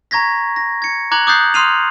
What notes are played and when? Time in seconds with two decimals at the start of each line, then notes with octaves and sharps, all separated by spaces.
0.11 A#5 C#6 G#6 A#6 B6
0.56 A#6
0.82 G#6 C#7
1.11 A#5 D6 F#6 G#6 F#7
1.27 D6 D#6 F#6 G6 A6 C7
1.54 C6 D#6 F6 C7 D#7 F7